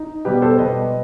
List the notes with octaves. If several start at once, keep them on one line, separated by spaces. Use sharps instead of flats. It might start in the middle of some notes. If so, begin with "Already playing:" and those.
Already playing: D#4
B2 G3 B3 G4 B4
A4 C5
B2 G3 B3 B4 D#5